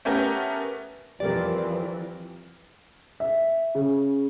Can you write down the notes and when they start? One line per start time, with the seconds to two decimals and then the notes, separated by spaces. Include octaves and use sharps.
0.05 A3 B3 C#4 G4 A#4
1.20 F2 E3 F3 G3 A#4 D5
3.20 E5
3.75 C#3